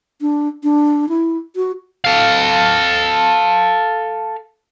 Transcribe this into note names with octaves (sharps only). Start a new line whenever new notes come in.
D4
D4
E4
F#4
A4 F5